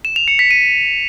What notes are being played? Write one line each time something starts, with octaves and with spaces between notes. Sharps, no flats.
E7
F7
C#7
B6
D#7